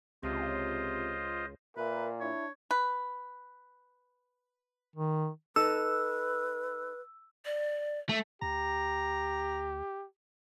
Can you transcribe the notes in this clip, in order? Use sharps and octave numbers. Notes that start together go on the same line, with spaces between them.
C#2 C3 F4 C5 D#5
A#2 A#4 B4 E5
D4 E4 C#5
B4
D#3
D#4 A4 B4 E6
D5
A3
D2 G4 A#5